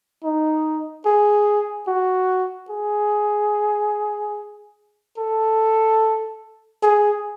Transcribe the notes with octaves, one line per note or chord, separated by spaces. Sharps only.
D#4
G#4
F#4
G#4
A4
G#4